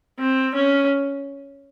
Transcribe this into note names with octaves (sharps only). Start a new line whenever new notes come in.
C4
C#4